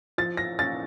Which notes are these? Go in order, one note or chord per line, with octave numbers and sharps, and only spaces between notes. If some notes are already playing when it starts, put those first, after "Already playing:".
F3 A6
A#6
C#4 A6